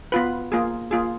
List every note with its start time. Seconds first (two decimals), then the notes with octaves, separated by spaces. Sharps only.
0.12 B3 F4 B4
0.52 A#3 F4 G#4
0.91 A#3 F4 G#4